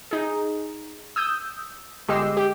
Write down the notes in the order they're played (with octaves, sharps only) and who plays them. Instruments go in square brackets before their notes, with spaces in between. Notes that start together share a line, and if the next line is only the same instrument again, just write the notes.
[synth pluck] D#4 G#4
D#6 E6 G6
G1 G#3 G4 D#5 E6 C7
G4